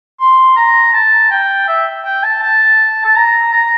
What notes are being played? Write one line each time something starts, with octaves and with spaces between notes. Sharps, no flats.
C6
A#5
A5
G5
E5
G5
A5
A5
A5
A#5
A#5